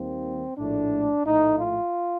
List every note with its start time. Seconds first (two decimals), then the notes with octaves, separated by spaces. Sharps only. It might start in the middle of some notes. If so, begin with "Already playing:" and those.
Already playing: D#2 D#3 G3 A#3 C4
0.58 A#1 A2 A3 D4
1.24 A#1 A2 A3 D#4
1.58 F4